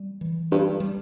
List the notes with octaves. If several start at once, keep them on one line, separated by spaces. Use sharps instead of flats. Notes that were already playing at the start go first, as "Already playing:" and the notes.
Already playing: G3
E3
G2 G3
G3